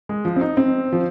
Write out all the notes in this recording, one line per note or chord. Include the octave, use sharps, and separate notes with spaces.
G#3
F3
C4
D#4
C4
F3